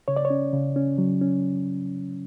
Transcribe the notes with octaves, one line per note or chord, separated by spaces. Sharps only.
C#3 C#5
D5
C#5
C#4
C#3
C#4
F#3
C#4